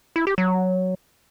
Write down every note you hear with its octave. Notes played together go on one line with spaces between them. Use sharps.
E4
G4
F#3